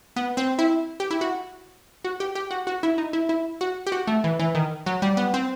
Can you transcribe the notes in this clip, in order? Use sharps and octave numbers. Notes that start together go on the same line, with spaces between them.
B3
C4
E4
G4
E4
F#4
F#4
G4
G4
F#4
F#4
E4
D#4
E4
E4
F#4
G4
F#4
A3
E3
E3
D#3
F#3
G3
B3
C4